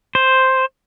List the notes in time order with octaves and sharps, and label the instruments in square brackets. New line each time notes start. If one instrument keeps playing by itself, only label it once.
[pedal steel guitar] C5